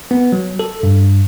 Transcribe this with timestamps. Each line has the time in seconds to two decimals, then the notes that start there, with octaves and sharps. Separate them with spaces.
0.11 B3
0.32 F#3
0.59 A4
0.83 G2